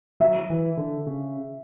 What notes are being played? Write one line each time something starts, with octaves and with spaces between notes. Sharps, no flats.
F#3 E5
E3
D3
C#3